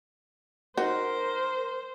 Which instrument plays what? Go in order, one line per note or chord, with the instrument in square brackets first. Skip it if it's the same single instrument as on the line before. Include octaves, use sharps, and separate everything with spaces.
[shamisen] D#4 F#4 [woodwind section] A#4 [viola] C5